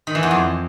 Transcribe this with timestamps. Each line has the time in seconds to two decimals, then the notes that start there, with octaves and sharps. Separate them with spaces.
0.07 D#3
0.15 E3
0.23 E2
0.31 F2